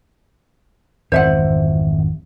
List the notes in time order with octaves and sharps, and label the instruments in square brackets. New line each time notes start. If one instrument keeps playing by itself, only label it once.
[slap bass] G#1 F2 E3 [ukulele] C5 E5 F#5